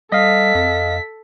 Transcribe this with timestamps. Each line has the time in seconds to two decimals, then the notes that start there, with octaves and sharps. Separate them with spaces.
0.12 G3 A4 D#5 F5 B6
0.55 F2